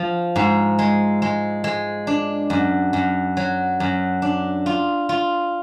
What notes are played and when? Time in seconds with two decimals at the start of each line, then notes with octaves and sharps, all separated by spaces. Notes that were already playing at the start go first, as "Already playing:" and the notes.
Already playing: F3
0.36 G#2
0.79 G#3
1.22 G#3
1.64 G#3
2.07 D4
2.50 F#2
2.93 F#2
3.37 F#3
3.80 F#2
4.22 D4
4.66 F4
5.09 F4